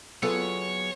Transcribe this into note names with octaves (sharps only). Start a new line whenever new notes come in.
F#3 B3 F4 G#4 A4 C#5 A5